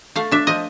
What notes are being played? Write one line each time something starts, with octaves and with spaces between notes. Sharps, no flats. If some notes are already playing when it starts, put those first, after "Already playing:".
A3 F5
D4 E5
F3 D#5